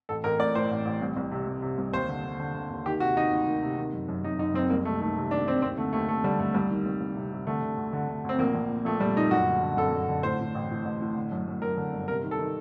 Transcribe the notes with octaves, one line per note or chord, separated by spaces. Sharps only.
A1 A4
A1 A#4
A2 D5
A2 C5
A1
A1
C2
C2
C3
C2
C3
C2
D#2 C5
D3
D3
D3
D3
D#2
D#3 G4
C3 F#4
D#3 D#4
D2
D#3
C3
D#3
F#1
F#2
F#2 D#4
F#1 D#4
F#1 C4
C2 A#3
C3 A3
D#3 A3
C3
D#3 D4
D#3 C4
D#2 C4
D3 A3
D#2 A3
D#2 A3
D3 G3
D#2 A3
C2 G3
D#3
C2
C2
C3
C3
D3 A3
D3
D2
D3
D3
D2 C4
A#1 A#3
A#1
A#2
A#1 A3
A#2 G3
A#2 D#4
F#1 F#4
D3
D3
F#1 A4
F#1
D3
A2 C5
A2
A1
A2
A1
A2
D3
F#2
F#2
F#2 A#4
D3
G1
C3 A#4
D#3
A4
D#3